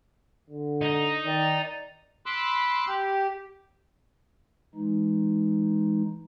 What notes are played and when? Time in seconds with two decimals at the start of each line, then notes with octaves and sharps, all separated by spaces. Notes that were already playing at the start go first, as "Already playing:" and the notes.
0.50 D3
0.81 D#4
1.26 D#3 D5
2.26 B5 C6 D6 E6 F#6
2.87 G4
4.75 E3 G#3 D#4